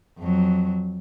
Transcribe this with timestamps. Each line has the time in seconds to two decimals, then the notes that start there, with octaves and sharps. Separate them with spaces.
0.19 F2 F#3